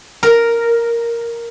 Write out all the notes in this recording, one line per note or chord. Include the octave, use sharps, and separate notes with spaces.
A#4